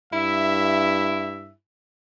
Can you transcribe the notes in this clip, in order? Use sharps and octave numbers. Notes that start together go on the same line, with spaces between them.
G2 E4 E5